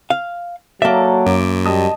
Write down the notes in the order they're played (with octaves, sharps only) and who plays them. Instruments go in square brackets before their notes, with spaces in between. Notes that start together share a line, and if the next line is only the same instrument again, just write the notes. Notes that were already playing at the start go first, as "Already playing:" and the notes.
[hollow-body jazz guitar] F5
[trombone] F#3 [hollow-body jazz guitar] A#3 E5 [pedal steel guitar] A4 D5
[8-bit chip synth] F#2 [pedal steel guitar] D6
[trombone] G3 [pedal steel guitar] D#5 A5 D#6